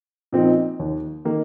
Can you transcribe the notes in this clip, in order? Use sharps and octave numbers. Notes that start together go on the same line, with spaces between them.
A#2 F3 C4 D#4
D#2
D#3 A#3